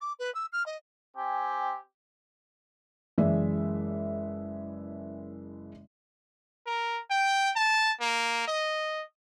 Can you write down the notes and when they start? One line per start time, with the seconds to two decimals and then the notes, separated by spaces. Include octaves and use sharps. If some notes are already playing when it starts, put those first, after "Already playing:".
0.01 D6
0.19 B4
0.34 E6
0.52 F6
0.66 D#5
1.16 C4 G4 G#5
3.18 F#1 E3 G#3 D5 E5
6.67 A#4
7.11 G5
7.56 A5
8.00 A#3
8.48 D#5